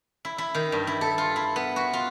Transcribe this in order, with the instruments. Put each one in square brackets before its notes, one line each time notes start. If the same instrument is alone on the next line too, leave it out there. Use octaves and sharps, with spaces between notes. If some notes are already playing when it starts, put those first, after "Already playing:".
[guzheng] E4
E4
D#3
G2
E4
A4
F4
E4
B3
F#4
F4